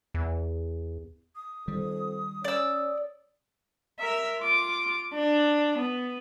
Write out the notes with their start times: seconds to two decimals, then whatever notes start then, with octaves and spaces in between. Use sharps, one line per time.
0.14 E2
1.36 D#6
1.68 F2 D#3 G3
2.44 C#4 D5 E6
4.00 A#4 E5
4.40 F4 D6
5.14 D4
5.78 B3